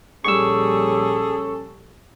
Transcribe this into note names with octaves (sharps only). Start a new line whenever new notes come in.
A#1 G3 C#4 G#4 A4 C#6 E6